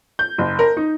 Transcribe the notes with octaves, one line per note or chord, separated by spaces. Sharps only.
G6
F#1
A#4
D#4